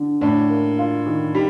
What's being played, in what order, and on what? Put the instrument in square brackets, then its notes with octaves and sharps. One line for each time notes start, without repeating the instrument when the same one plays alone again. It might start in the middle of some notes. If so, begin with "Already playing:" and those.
Already playing: [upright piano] D3
[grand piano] A2 [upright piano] D4
[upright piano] A#3
F4
D#3
[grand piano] G3 [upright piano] D#4